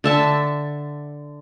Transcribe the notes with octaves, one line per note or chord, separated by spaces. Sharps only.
D3 E5 A5